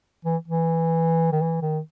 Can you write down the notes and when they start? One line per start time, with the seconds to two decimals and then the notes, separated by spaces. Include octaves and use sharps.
0.25 E3
0.48 E3
1.32 D#3
1.42 E3
1.61 D#3